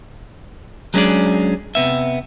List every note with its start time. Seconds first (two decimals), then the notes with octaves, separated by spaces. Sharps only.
0.94 F#3 G#3 C#4 D4 G#4 D5
1.75 C3 B3 E5